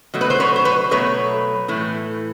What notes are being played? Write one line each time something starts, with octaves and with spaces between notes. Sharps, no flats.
B2 F#3 A3
B4
C5
B4 C#5
C5
B4 C#5
B2 F#3 A3 B4 C#5
A2 E3 A3